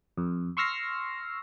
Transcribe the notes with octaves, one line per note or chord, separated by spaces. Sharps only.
F2
C6 C#6 E6 F6 A#6 C7